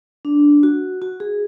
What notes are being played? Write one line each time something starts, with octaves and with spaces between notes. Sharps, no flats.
D4
F#4
F#4
G#4